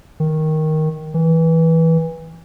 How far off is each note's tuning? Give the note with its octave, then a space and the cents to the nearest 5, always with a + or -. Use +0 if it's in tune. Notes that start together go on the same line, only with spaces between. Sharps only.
D#3 +5
E3 -15